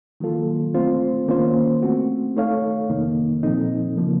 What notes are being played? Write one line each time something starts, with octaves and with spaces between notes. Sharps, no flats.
D#3 F#3 A#3 F4 A4
A3 C4 F4 C5
D#3 A#3 C#4 F4 C5
A3 C4 F#4
A3 D#4 A4 C#5 F5
F2 C3 D#3 A#3 D#4
A#2 F3 C4 D#4 A4
C#3 F3 A#3